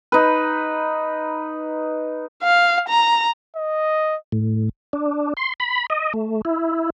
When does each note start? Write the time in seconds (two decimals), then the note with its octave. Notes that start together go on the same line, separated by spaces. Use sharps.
0.12 D#4 B4
2.43 F5
2.88 A#5
3.56 D#5
4.32 A2
4.93 D4
5.37 C6
5.60 B5
5.90 D#5
6.13 A3
6.45 E4